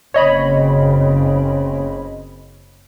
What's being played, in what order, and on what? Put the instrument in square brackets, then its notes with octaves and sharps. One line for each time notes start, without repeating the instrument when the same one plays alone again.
[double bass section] F#1 C#3 C4 [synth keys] C#5 D#5 B5